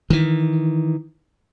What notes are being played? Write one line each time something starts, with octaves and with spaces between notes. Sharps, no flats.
D#3 E3